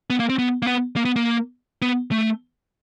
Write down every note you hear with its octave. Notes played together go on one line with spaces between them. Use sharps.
B3
A#3
C4
B3
A#3
B3
A#3
B3
A#3
B3
A3